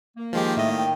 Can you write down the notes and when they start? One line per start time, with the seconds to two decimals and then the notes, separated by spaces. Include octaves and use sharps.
0.17 A#3
0.33 D#3 F3 G#3 G4
0.57 A2 D#5 E5
0.78 G5